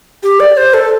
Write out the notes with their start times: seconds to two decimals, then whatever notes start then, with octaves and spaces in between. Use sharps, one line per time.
0.23 G4
0.40 D5
0.57 C5
0.74 A4